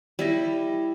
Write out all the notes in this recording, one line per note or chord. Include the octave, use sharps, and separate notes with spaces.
G3 E4 D#5